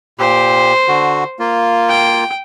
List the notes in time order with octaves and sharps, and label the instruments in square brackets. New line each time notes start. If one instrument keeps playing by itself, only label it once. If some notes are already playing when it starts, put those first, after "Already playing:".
[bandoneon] A#2 G4 [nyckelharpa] C5
[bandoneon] D3 F#4
A#3 F4
[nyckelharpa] G5